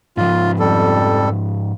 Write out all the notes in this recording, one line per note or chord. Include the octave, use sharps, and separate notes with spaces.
G#2 F3 F4
F2 G3 A4